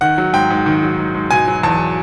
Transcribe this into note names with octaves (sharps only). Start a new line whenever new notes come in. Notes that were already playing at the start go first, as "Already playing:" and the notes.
D#3 F#5
F#3
G#2 G5
G#2
D#3
F#3
G#2
G#2
B2 G#5
F#3
E2 A5